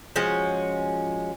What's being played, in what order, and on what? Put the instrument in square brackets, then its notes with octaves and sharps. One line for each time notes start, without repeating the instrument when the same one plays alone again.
[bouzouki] F3 G#3 C#4 F#4